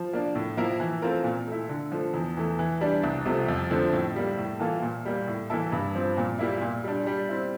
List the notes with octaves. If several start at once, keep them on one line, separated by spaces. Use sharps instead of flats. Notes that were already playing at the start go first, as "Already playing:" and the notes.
Already playing: F3
A#3 D4
A2
F3 A#3 E4 A#4
E3
A3 C4 F4 A#4
A#2
A3 E4
D3
F3 A3
E2
E3 A3
E3
G3 D4
C2
C3 F3 A3
F2
D3 F3 A3 C4
A2
G3 A#3
A2
E3 A#3 F4 A4
A#2
G3 A#3
A2
E3 A#3 E4 A4
G2
F3 C4
A#2
G3 A#3 E4
A#2
G3 D4
G3
C4 E4